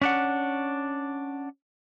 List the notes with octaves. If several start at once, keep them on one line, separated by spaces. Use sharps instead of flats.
C#4 D4 F#5